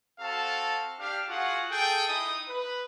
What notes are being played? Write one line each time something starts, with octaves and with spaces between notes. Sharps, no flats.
C4 F#4 A4 F5 A5
D4 G4 F5
F4 F#4 G#4 F#5
G#4 A4 G5
D#4 E4 D#6
B4